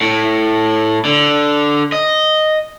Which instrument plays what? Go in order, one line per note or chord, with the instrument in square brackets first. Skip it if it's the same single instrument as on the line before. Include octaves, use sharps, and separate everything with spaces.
[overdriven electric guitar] A2
D3
D#5